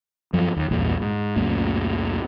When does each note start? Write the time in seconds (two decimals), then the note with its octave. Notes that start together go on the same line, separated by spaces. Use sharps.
0.33 F#2 F3
0.56 D#2
0.71 A#1 E2 G2 A#2
1.02 G#2
1.36 C#2 F#2 A#2 A3